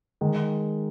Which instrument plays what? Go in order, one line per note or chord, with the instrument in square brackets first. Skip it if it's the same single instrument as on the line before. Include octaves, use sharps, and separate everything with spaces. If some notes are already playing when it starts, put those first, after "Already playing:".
[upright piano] D#3 G#3